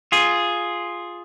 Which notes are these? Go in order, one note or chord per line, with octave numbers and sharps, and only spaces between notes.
F4 G#4